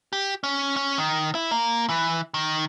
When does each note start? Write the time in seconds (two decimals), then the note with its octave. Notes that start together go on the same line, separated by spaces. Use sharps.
0.13 G4
0.44 C#4
0.76 C#4
0.98 D#3
1.35 E4
1.51 A#3
1.89 E3
2.34 D#3